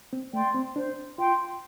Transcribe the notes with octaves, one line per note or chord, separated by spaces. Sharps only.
C4
A3 D5 G5 C6
C4
D4 C5
F4 G5 C6